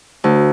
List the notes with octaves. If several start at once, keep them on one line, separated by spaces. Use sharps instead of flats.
D2